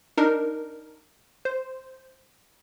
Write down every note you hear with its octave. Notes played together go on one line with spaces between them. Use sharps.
D4 D#4 A#4
C5